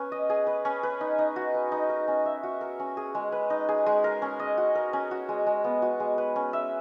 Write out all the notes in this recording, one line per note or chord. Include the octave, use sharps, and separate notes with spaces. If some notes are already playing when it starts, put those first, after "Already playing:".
Already playing: C#4 B4
D#5
G#4
B4
C#4
B4
D#4
D#4
F#4
B4
D#4
A#4
C#4
E5
F#4
A#4
C#4
G#4
G#3
B4
D#4
G#4
G#3
A#4
C#4
D#5
F#4
A#4
C#4
F#4
G#3
G#3
B3
F#4
G#3
B4
C#4
E5